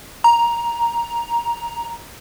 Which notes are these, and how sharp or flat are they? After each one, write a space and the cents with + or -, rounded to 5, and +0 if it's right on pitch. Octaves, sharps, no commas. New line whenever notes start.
A#5 +10